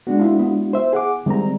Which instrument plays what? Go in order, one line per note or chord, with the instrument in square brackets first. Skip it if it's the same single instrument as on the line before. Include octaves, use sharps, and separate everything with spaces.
[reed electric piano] G#3 D4 F#4 [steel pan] B3
[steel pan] E4 F4
B3
[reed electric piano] C5 E5
G#4 F#5 D6
[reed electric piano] D#3 C4 A#5 [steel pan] E3 G3 G#3